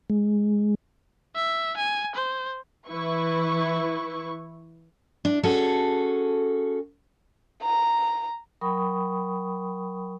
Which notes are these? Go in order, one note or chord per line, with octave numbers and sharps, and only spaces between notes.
G#3
E5
G#5
C5
E3 E4 B4 C#6
D4
C#4 F#4 G#4 A4
A#5
F#3 A#4 G5 B5 C#6 D#6